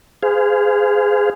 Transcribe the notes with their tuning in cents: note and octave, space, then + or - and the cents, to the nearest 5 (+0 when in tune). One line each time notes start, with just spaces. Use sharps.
G#4 +0 C5 -40 F5 +0